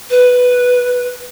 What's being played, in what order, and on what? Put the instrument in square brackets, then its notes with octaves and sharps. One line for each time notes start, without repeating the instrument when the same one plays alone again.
[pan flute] B4